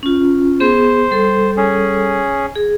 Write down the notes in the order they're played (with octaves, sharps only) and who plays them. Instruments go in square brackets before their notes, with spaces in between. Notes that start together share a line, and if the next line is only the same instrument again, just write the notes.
[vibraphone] C#4 F4
[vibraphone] B3 G#4 [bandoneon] C5
[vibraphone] G3 A4
[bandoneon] C#4 G#4
[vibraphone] G#4